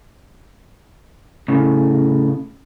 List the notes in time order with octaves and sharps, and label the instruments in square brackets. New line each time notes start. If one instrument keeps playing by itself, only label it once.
[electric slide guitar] A2 C#3